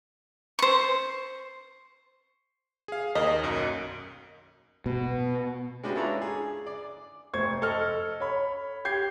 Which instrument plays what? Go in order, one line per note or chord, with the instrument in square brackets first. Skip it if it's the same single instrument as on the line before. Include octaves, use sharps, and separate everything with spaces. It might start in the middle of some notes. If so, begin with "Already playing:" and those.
[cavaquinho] C5 C#6
[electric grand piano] G#4 F5
[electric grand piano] D#2 A#4 [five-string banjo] D#5
[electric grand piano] B1 F#2
[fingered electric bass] B2
[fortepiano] G#3 C#4 D4 F#4 G4 B4
D4 E4 F4 A4 C#5 A#5
G#4
D5
[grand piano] F1 C5 C#6 G#6
A4 D#5 F6
C#5 B5
G4 G6 G#6 C7